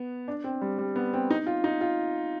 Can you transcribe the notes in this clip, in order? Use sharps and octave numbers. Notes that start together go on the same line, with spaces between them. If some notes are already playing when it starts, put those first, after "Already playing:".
Already playing: B3
D4
C4
G3
G3
B3
C4
D#4
F4
D#4
F4